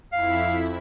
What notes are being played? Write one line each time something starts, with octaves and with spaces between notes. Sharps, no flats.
F2 E4 F5 B6